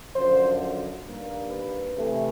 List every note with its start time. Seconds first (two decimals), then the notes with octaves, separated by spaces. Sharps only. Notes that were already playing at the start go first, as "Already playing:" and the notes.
0.16 F#2 D3 F3 C5
1.06 G2 D#3 G3 A#3
1.50 B4
1.95 C3 E3 A3